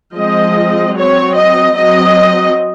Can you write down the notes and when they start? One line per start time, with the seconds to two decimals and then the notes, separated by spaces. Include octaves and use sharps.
0.17 F3 G#3 C4 D#5
0.97 F#3 C4 C#5
1.36 D#5
1.76 F#3 C4 D#5